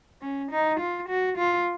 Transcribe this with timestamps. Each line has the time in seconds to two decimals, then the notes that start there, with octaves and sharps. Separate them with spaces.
0.22 C#4
0.51 D#4
0.80 F4
1.09 F#4
1.38 F4